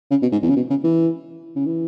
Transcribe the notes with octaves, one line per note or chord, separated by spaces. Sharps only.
C#3
B2
G#2
E2
C#3
B2
C#3
E3
C#3
E3